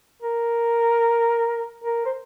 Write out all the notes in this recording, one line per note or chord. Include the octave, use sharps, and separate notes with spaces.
A#4
A#4
C5